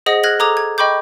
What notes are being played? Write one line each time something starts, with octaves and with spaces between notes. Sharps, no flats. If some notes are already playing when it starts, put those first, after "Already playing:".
G#4 C5 D#5 F#5 D#6 A#6
F6 F#6 G#6 A#6 F#7
A4 A#5 D6 D#6 G#6 F7
G#6
D#5 G5 B5 C#6 D6 G6